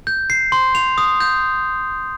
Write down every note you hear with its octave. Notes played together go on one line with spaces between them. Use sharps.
G6
C7
C6
F7
D#6
G6